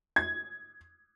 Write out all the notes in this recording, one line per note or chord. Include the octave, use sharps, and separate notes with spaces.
G#6